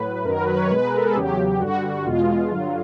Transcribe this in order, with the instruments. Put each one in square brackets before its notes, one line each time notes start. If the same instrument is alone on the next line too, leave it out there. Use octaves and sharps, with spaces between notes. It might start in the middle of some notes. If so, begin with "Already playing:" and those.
Already playing: [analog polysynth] A2 F#3 B4
F#2 D#3 F#3 A#4
B4
C#5
B2 G#3 B4
A#4
A4
G#4
E2 C#3 F#3 G4
G2 D3 G3 F#4
E2 B2 G#3 F4
G2 D3 F#3